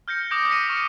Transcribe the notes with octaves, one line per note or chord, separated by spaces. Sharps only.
F6 G6 A#6 C#7
D6 D#6 G6 A#6 D7
A#6 B6 C#7 D#7
C#6 F6 C#7 F7